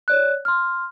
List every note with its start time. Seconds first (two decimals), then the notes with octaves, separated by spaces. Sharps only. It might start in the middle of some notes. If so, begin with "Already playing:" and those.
0.08 C#5 D5 F#6
0.45 C6 F6